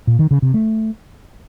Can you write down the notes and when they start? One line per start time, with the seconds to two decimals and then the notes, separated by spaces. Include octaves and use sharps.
0.07 A#2
0.19 D#3
0.31 C#3
0.42 C3
0.54 A3